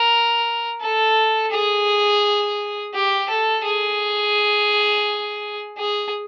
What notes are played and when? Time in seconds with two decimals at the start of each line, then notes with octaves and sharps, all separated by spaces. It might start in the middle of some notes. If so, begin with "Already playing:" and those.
Already playing: A#4
0.81 A4
1.51 G#4
2.94 G4
3.29 A4
3.64 G#4
5.77 G#4